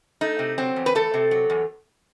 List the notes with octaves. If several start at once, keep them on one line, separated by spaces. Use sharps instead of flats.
A3 D#4
C3
F#3 C4
E2
B4
A3 A4
C3
F#3
E2